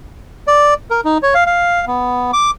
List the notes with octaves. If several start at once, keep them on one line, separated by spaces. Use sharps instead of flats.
D5
A#4
D#4
C#5
F5
F5
B3
D6